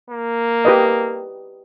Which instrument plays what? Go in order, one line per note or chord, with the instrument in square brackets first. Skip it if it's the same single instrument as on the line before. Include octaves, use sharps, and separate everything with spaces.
[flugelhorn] A#3
[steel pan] G4 B4 D#5